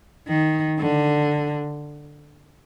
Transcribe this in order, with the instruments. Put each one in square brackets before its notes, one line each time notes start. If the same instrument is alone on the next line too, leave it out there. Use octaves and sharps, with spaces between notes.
[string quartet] D#3
D3